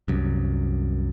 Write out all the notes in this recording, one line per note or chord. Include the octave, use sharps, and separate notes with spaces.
C2 F#2